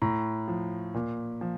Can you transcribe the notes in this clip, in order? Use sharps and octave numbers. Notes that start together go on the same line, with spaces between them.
A2 A#5
F3
A#2
F3